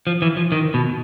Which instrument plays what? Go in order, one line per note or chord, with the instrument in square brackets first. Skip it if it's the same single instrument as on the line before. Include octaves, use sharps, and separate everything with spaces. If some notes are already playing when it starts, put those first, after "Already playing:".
[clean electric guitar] F3
E3
F3
D#3
B2